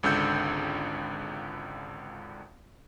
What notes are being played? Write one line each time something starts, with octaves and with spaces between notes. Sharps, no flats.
G#1 C#2 D3 E6 G6 C#7